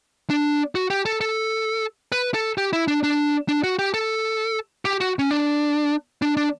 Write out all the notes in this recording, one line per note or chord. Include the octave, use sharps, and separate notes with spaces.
D4
F#4
G4
A4
A4
B4
A4
G4
E4
D4
D4
D4
F#4
G4
A4
G4
F#4
C#4
D4
D4
D4